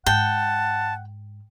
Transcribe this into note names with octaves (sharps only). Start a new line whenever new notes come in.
G#2 F#5 G5 A5